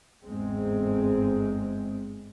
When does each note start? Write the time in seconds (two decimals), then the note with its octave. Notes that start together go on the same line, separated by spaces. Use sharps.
0.24 G1 E2 G#2 G#3 C4